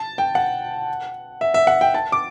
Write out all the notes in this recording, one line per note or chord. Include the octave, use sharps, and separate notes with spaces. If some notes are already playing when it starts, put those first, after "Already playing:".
Already playing: A5
G5
F#5
E5
E5
F#5
G5
A5
D6